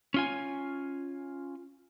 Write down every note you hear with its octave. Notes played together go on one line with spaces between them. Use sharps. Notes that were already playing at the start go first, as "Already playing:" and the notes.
C#4 F4 G#5